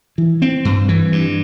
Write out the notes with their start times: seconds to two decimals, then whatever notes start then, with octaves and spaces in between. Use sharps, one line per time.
0.18 E3
0.42 C4
0.65 G2
0.89 E3
1.12 G2